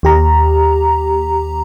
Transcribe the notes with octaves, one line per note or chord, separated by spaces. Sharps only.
D#2 G4 A#5